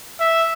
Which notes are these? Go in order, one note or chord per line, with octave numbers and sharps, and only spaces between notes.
E5